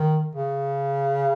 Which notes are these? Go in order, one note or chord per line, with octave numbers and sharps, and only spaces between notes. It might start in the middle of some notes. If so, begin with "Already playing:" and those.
Already playing: D#3
C#3